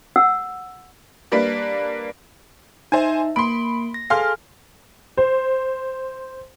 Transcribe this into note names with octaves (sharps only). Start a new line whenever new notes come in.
F#5 E6
G3 A#3 D4 B4
D#4 C5 E5 G#5
A#3 B5 C6 D7
A#6
G#4 A4 F5 G#5 C6 F6
C5